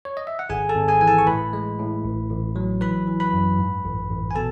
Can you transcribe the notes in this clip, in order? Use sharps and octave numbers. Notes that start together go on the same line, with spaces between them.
C#5
D#5
E5
F#5
G#1 G#4 G#5
A4 A5
G#1
G#4 G#5
E3 G#5
A4 A5
C#6
A2 B4 B5
G#3
A2
A1
A1
F#3
E3 B4 B5
E3
B4 B5
F#2
G#2
A1
A1
G#5
B2 A4 A5